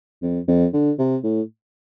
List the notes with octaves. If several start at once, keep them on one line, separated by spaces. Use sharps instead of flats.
F2
F2
D3
C3
A2